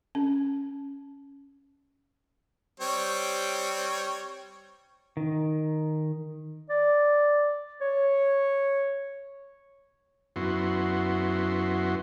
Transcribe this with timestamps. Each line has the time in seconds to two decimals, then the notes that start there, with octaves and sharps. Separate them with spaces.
0.15 C#4
2.80 G3 C4 C#5
5.17 D#3
6.70 D5
7.81 C#5
10.36 F#2 B3 E4 F#4 C6